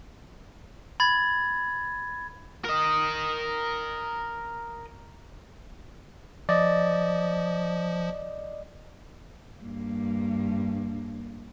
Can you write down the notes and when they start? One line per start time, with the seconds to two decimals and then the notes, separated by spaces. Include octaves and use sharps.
1.00 B5 G#6 A6
2.65 A#4 D#5
6.49 F3 D5 D#5
9.61 G2 A#3